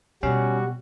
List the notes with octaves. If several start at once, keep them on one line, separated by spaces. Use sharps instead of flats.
B2 G3 C#4 F#4